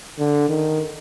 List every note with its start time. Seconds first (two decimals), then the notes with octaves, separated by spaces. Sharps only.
0.19 D3
0.49 D#3